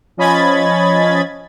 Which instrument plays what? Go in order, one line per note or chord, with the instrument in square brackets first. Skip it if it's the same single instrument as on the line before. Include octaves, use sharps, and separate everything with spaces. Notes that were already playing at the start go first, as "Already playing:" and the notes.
[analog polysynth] F3 C#4 D#5 B5 G#6 A6